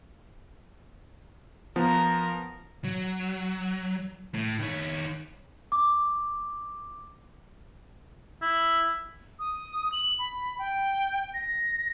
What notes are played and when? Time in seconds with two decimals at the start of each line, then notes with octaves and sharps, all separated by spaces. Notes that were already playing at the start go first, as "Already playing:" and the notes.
1.76 F3 B3 A#4 A#5
2.84 F#3
4.34 A2
4.60 D#3 C#5
5.72 D6
8.42 E4
9.39 D#6
9.92 F#7
10.19 B5
10.59 G5
11.34 A#6